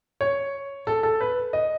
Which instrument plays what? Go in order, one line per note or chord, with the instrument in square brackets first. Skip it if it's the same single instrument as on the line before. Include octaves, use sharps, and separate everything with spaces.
[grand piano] C#5
A4
A4
B4
D#5